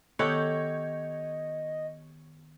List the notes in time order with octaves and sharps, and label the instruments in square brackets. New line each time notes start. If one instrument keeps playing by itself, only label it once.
[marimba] D#3 B3 [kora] G4 A4 F#5 [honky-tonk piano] C#5 G6 [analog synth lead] D#5